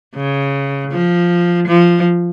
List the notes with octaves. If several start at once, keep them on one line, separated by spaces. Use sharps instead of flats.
C#3
F3
F3